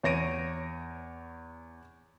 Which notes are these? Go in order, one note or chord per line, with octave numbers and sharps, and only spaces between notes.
E2 C#5 A#6 D7 D#7